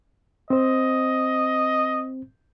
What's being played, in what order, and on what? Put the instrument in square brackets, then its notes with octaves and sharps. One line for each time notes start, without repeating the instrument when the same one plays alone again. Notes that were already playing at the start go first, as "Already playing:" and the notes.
[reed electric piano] C4 C5 [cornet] D#5